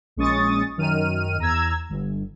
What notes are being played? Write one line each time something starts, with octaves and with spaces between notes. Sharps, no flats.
A#1 G#3 C#4 C#6 D#6 A6
F#2 D#3 F6 D#7
E2 A#5 E6 G#6
G1